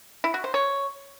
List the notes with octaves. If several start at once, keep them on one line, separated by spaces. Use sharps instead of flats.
E4
F#4
C5
C#5